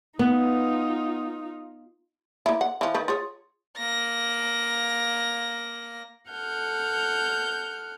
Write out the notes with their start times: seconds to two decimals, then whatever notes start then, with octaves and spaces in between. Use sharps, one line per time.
0.19 B3 D#4 F4
2.46 A#3 E4
2.61 F#5
2.81 E3 F3
2.94 D#3 B4
3.08 F4 G#4 C#5
3.78 A#3 A#6
6.31 A4 F#5 F6 G6